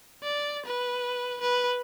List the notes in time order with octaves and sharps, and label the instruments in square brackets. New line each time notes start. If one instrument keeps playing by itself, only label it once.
[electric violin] D5
B4
B4